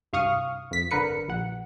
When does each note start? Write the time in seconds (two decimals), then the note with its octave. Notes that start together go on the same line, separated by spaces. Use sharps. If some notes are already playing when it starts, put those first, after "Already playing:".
0.13 C2 G2 F5 C#6 D#6 F6
0.71 F2 B6
0.91 G1 D3 A#4 B4 C#7
1.28 A#1 F#5